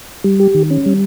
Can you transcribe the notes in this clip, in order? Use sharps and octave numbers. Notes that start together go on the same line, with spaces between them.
G3
G4
D#3
C#4
G3